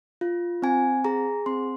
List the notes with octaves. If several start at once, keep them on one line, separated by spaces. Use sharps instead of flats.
F4
C4 G#5
G#4 A#5
C4 C6